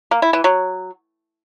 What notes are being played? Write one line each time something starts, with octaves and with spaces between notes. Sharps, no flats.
A#3
E4
E3
F#3